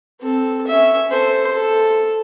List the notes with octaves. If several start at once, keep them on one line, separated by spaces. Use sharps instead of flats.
C4 A4
C#4 E5
A4 C5
A4